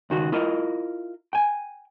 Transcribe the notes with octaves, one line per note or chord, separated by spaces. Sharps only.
C#2 D#3 F#4
E4 F4 A#4 D#5
G5 G#5